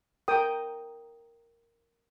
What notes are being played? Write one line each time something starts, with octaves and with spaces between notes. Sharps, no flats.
A#4 G5 D#6